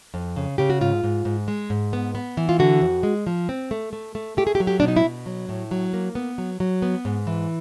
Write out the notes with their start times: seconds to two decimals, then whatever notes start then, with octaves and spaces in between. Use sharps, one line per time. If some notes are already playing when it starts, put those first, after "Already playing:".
0.14 F2
0.36 C#3
0.58 C#3 G4
0.70 F#4
0.81 G#2 F4
1.04 G#2
1.25 G#2
1.48 G#3
1.70 G#2
1.93 B3
2.15 B3
2.37 E3
2.49 F4
2.59 D3 F#4
2.81 F2
3.03 G#3
3.27 F3
3.49 C4
3.71 A3
3.93 A3
4.15 A3
4.37 A3 G4
4.47 G#4
4.55 G4
4.60 F#3
4.67 G4
4.80 B2 D4
4.88 D#4
4.96 E4
5.04 B2
5.26 F#3
5.49 A2
5.71 F#3
5.93 A#3
6.15 B3
6.38 F#3
6.60 F#3
6.82 B3
7.05 G#2
7.27 E3